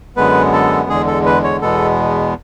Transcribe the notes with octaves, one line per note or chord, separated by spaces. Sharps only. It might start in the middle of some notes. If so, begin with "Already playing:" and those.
F#2 D3 G#3 B3 B4
A4
E2 D3 G#3 G#4
A4
B4
C#5
E2 B2 G#3 B3 A4